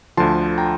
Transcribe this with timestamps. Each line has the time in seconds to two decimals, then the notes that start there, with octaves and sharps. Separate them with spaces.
0.17 D2 D3 F3 A5 C6
0.58 G5 A#5